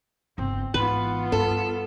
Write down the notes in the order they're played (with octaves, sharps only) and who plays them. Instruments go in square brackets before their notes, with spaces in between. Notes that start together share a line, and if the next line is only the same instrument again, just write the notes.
[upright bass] G1 C#3 [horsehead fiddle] C4
[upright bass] G#1 E3 [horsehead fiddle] B3 F4 [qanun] B4
[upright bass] G2 [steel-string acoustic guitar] A4